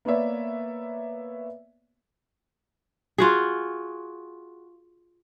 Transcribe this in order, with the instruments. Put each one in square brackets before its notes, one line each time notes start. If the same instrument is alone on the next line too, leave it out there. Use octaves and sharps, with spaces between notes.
[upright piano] A#3 B3 B4 C#5 D5 E5
[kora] F4 F#4 G#4